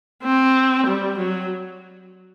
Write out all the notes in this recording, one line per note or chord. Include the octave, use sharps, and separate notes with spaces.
C4
G3
F#3